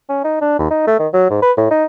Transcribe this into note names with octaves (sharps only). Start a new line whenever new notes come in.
C#4
D#4
D4
D#2
D#4
A3
D#3
F#3
G#2
B4
A2
D#4